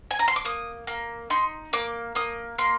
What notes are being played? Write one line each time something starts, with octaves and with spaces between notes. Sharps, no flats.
G#5
A#5
C6
D6
A#3 D#6
A#3
D#4 C6
A#3 D6
A#3 D#6
A#3 C6